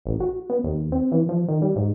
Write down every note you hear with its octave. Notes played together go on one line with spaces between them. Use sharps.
A1
F#4
B3
D#2
C4
E3
F3
D#3
G3
G#2